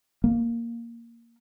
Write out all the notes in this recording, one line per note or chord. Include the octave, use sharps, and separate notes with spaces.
A#3